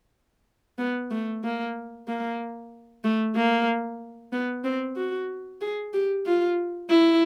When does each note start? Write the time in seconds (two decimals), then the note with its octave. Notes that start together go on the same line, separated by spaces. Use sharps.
0.78 B3
1.11 A3
1.44 A#3
2.08 A#3
3.04 A3
3.36 A#3
4.33 B3
4.64 C4
4.96 F#4
5.61 G#4
5.94 G4
6.26 F4
6.90 E4